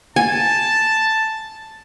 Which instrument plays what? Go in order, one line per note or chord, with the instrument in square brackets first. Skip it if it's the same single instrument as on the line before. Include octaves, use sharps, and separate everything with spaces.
[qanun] G#5 [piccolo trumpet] A5